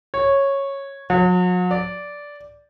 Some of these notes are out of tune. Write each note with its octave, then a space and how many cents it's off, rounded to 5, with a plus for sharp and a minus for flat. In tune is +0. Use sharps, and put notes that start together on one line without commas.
C#5 -10
F#3 -40
D5 -10